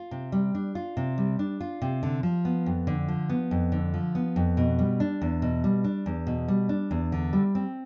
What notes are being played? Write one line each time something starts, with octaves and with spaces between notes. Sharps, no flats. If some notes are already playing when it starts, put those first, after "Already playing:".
Already playing: F4
C3
G3
D4
F4
C3
G3
D4
F4
C3
D3
F3
B3
F2
D3
F3
B3
F2
D3
F3
B3
F2
B2
G3
D4
E2
B2
G3
D4
E2
B2
G3
D4
E2
D3
G3
C4